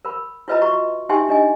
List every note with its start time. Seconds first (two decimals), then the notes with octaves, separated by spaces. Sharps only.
0.05 A#4 B5
0.48 E4 F4 B4 D#5 E5 A#5
0.62 F#4 A#5 C#6
1.09 D#4 G4 E5 G5 G#5 C6
1.29 D4 D#5 G#5